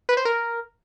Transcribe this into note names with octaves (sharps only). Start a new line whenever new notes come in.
B4
C5
A#4